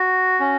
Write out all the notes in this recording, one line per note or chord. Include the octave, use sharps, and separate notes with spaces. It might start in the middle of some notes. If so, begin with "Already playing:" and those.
Already playing: F#4
C#4